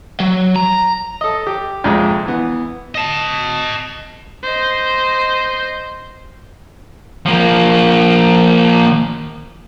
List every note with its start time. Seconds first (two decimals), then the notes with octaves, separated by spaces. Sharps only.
0.20 F#3
0.56 A#5
1.21 A4 D#5
1.47 G4
1.84 A#1 F2 C3 G#3 D5 G5
2.25 E3 B3
2.95 D#5 A5
4.44 C5 D#5
7.25 F3 A#3